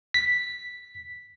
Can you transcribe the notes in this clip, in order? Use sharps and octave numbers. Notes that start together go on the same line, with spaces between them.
B6